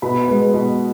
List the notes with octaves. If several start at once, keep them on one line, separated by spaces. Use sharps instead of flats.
B2 B5
G#3 B3
B2